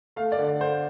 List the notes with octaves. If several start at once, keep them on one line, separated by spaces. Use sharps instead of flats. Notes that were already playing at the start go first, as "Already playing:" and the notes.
A3 F5
D5
D3
D3 C5